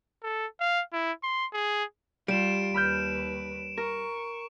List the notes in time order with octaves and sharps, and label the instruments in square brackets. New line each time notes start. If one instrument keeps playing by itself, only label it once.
[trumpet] A4
F5
E4
C6
G#4
[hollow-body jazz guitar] G3 [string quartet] F4 [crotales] D7 E7
[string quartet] D#2 B4 [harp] B5 F6 G6
[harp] A#4 [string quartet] C#6